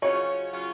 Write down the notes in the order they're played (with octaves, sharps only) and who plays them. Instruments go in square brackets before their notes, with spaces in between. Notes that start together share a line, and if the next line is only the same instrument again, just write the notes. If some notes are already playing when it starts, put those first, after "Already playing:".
[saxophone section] C#3 F#3 C#4 F4 [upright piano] C#5
[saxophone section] C#3 F#3 C#4 F4